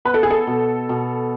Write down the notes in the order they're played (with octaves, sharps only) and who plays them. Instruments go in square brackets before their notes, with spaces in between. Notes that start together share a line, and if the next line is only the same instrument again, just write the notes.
[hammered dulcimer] B3 [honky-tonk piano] B4
[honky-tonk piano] A4
G#4
A4
[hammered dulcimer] B2
B2